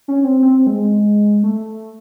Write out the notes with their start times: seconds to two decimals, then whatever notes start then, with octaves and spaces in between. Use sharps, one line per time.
0.08 C#4
0.24 C4
0.42 C4
0.67 G#3
1.43 A3